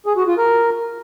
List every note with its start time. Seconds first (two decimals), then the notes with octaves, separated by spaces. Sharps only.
0.06 G#4
0.17 F#4
0.27 F4
0.38 A#4